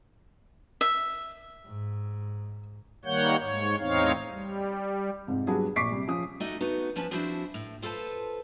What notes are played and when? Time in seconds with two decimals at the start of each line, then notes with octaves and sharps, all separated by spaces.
0.81 E5
1.67 G#2
3.05 D#3 G3 A#3 C#5 F#5 G6
3.39 G#2 C#5
3.79 E2 A2 C4 D#4 C#5 F5
4.30 G3
5.27 F2 G#2 C3
5.47 F#3 G3 B3 D4 F#4 G#4
5.76 A#1 C#6 D6 B6 C7 D7
5.92 C3 G3
6.08 F3 C#4 D#6
6.40 A3 D#4 F#4 G4 D#5
6.61 A3 B3 D#4 F#4
6.96 F3 B3 C#4 B4 A5
7.11 F3 C4 D4 E4 F#4 C5
7.54 A2
7.82 F4 A4 B4 C5 A5